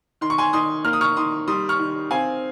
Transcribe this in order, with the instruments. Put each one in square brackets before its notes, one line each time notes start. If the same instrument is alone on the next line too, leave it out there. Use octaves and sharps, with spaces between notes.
[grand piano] D#3 C6
C#6
G#5 C6
D#3 C6 D#6
A#3 F6
D#6
C#6 F6
D#3 C6 D#6
G3 C6 D#6
C#6 F6
D#3
C4 F5 G#5